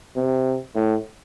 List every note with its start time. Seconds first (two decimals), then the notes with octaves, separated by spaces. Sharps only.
0.16 C3
0.75 A2